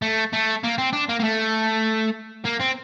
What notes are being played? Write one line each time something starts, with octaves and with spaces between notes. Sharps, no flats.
A3
A3
A#3
C4
D4
A#3
A#3
A3
A#3
C4